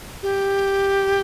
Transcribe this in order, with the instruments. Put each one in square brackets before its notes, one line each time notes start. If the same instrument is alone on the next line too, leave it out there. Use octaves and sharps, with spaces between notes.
[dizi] G4